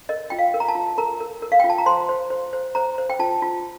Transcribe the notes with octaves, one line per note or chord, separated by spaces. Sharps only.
A#4 D#5
F4 G5
F5
A#4
A#5
A5
F4
A#4 A#5
A#4
A#4
F5
G5
F4
A5
A#5
C5 C6
C5
C5
C5
C5 A#5
C5
G5
F4 A5
F4